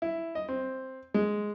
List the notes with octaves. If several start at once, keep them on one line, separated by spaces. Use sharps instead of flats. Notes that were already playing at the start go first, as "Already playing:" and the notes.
E4
D#5
C4
G#3